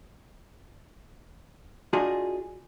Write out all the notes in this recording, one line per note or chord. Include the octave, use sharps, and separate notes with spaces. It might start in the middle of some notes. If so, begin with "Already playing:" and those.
D4 F4 F#4 G#4 D5 D#5